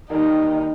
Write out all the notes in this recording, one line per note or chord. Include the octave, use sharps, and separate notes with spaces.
D#2 D#3 G3 A#3 D#4